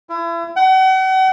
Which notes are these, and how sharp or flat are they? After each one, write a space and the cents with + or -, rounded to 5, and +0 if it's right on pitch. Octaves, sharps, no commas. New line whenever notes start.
E4 +35
F#5 +40